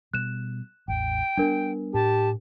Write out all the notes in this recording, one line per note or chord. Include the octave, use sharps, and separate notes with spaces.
B2 G3 F#6 E7
A1 E2 G5
G3 A3 B3 D4 A#4
A2 G4 A5